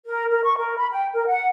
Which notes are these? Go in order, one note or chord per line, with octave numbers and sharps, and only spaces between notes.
A#4
A#4
C#6
A#4
B5
G5
A#4
F#5